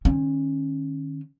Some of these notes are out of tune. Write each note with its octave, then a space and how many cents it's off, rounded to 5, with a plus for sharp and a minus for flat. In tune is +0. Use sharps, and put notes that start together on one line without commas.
D#3 -35 C#4 -20